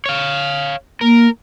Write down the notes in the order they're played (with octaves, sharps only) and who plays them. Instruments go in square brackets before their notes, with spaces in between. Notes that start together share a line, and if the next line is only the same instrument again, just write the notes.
[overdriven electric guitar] C#5 F5
[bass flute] A#3 [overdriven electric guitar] A#4